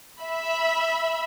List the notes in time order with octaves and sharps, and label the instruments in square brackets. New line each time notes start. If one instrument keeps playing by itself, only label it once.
[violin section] E5 B5